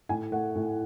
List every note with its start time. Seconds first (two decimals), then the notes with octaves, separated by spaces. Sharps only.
0.09 A2 G#5
0.32 A3 F#5
0.55 A2